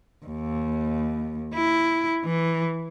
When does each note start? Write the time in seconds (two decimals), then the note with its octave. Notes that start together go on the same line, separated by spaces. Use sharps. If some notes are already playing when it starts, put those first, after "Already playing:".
0.26 D#2
1.54 E4
2.25 E3